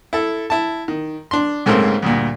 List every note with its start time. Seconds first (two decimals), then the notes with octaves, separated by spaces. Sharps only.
0.13 E4 A4
0.50 E4 A5
0.88 D#3
1.31 D4 C6
1.66 C#2 G#2 C#3 A3 A#3 C4
2.02 D2 G2 A#2